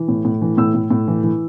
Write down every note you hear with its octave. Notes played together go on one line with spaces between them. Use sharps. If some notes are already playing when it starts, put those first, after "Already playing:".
Already playing: E3
A2
A2
E3
A2 E6
A2
A2
E3
E3